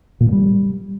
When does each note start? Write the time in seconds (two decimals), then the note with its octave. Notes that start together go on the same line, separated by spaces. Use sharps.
0.20 A#2
0.26 G2
0.32 G3